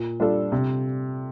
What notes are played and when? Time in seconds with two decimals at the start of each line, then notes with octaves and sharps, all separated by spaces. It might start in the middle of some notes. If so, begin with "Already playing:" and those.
Already playing: A#2
0.20 G3 D4 F4 A4
0.52 C3